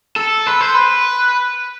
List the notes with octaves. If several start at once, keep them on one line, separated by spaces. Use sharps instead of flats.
A4
B4
C5
B4